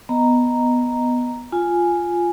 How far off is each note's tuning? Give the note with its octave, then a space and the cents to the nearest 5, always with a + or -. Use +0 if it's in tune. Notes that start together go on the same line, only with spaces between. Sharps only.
B3 +0 D#5 +0 A#5 +0
F4 +0 G#5 +0